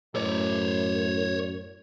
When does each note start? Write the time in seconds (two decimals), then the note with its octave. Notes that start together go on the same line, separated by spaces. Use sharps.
0.16 F#2 A2 C#5 D5